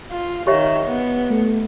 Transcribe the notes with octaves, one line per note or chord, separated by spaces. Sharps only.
F4
D#3 G4 C#5 E5
B3
A3